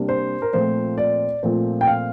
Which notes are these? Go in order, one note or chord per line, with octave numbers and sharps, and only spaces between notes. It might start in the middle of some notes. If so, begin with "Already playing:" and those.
Already playing: C3 G3 A#3 D4
C5
A#4
A#2 F3 A3 C4 C5
D5
A#2 F3 A3 C4
G5
F5